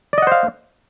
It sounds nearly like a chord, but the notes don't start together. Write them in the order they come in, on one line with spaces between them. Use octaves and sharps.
D5 D#5 F#5 C5 F5